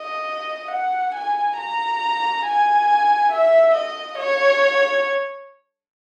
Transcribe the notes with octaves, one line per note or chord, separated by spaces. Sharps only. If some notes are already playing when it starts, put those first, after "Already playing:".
Already playing: D#5
F#5
G#5
A#5
G#5
E5
D#5
C#5